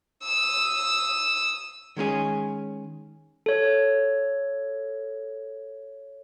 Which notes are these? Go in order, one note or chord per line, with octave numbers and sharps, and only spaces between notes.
D#6 E6
D#3 G#3 C#4 G#4
A4 C#5